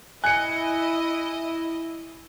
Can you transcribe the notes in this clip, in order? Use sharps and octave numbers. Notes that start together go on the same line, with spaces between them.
E4 D#5 G#5 F#6 C#7